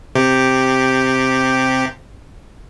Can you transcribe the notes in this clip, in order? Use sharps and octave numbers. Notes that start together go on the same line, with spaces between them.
C3 G4